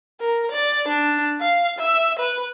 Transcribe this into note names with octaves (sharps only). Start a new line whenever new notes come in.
A#4
D5
D4
F5
E5
B4